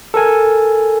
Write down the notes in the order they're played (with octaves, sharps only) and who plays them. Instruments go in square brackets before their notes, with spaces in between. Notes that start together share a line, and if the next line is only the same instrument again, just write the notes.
[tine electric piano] A4 A#4 G#5